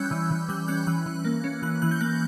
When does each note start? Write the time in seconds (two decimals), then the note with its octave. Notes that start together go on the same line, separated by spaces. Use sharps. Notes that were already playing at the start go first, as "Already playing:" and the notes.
Already playing: E3 G3 C#4 E6 F#6 G6
0.11 E3
0.30 E3
0.49 G3 G6
0.68 C#4 F#6
0.87 E3 F#6
1.06 E3
1.24 A#3
1.44 C#4
1.62 E3 F#6
1.82 E3 F#6
1.91 G6
2.01 A#3 F#6